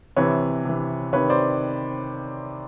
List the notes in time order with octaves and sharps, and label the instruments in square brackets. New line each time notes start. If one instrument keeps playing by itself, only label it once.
[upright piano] C3 E3 B4 C#5
C3 E3
C3 D#3 B4 C#5
C5 D5